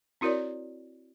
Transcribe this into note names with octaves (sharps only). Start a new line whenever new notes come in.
C4 E4 F#4 A#4 C#5 D5